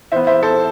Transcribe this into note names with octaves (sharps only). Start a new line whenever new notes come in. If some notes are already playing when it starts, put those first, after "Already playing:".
E3 B3 C5 E5
C5 E5
A4 C5